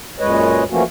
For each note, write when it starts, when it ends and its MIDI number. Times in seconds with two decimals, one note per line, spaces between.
0.19 0.63 42
0.19 0.63 46
0.19 0.63 56
0.19 0.63 71
0.19 0.63 73
0.19 0.63 75
0.70 0.83 52
0.70 0.83 53
0.70 0.83 57
0.70 0.83 58
0.70 0.83 61
0.70 0.83 66